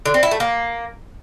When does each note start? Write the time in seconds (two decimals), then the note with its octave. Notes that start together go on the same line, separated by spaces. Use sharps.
0.06 D3
0.14 C4
0.23 E4
0.31 A3
0.40 A#3